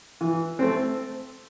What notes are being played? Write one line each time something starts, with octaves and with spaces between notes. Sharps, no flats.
E3
A3 C4